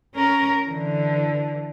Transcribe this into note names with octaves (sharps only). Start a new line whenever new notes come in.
C#4 A#4
D3 E3